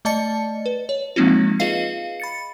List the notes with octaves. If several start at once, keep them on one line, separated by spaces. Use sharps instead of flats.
A3 D5 D#5 A5 A6 C#7
B4
C#5
F3 G#3 A#3 C4 D#4 F4
F4 G#4 B4 D#5 F5 C7
B5 A6 C#7